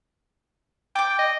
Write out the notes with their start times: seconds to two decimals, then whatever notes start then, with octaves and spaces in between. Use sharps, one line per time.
0.95 D5 G5 D6
1.19 D#5